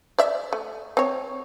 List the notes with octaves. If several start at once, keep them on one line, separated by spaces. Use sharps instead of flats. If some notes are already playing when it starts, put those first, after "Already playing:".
D5 E5
A3
C4 C#5